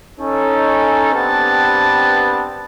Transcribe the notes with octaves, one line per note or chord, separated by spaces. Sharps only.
C#4 D#4 A4
B3 C4 D4 G4 B4 A5